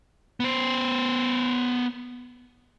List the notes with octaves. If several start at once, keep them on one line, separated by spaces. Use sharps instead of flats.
B3 C5